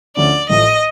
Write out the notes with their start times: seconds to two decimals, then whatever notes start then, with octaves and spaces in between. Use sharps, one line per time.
0.16 D2 D3 F3 A3 C#4 D5
0.49 A1 A2 F3 A3 D#5